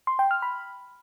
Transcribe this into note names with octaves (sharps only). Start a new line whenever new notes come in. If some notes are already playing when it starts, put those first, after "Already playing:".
C6
G5
F6
B5